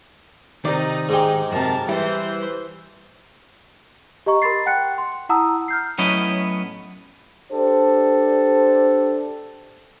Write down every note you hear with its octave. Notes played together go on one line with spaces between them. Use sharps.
C3 D#3 D#4 D5
G#2 G#3 G4
F#2 C3 A#4 A5
E3 G3 E4 C5
G4 D#5 A#5 C#6
A#4 B5 C6 A6 C7
F#5 G5 F#6 C#7
C6
E4 F#5 A5 A#5 D#6 E6
F6 G6 C7
A2 F#3 B3 C#4 E4 D#5
D4 G4 A4 C5